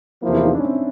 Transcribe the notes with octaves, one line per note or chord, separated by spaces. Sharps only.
E2 C3 F3 A#3 E4
E4
D#4
D4
C#4
C4